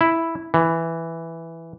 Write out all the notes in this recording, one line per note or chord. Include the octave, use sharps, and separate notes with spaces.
E4
E3